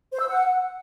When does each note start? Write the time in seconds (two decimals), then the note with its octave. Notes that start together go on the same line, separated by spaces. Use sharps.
0.12 C5
0.20 E6
0.28 F#5